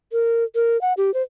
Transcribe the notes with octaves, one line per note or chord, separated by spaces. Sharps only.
A#4
A#4
F#5
G4
C5